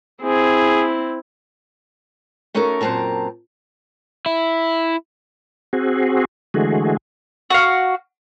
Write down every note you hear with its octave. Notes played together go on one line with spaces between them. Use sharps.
C4 E4 G#4
A3 C#4 D#4 F#4 A4 A#4
F#2 A#2 C4 A5 A#5
E4
C4 F#4 G#4
D3 E3 G#3 A3 F#4 G#4
F#4 F5